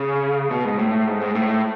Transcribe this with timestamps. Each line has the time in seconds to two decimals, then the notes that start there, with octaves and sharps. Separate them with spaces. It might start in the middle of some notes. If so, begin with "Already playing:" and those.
Already playing: C#3
0.51 B2
0.65 G#2
0.79 A2
1.07 G#2
1.21 G#2
1.35 A2